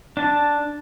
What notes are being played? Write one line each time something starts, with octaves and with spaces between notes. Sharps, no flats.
D4 A5